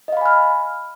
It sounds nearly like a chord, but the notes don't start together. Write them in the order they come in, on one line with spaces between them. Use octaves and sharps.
D#5 F5 B5 G#5 F6